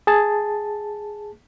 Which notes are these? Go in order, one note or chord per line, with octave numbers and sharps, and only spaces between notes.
G#4 A5